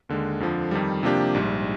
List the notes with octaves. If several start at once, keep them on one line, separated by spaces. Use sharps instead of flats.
D#2 D3 G#3
F2 D3 F3
F2 D#3 G3
C3 F3 A#3 D4 G4
A#1 G#2 G3